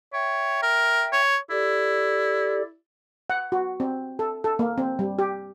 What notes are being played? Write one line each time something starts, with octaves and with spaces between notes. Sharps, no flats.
C#5 E5 G5
A#4
C#5
E4 G4 A4 D5
F#5
F#4
C4
A4
A4
A#3
C4
G3
G4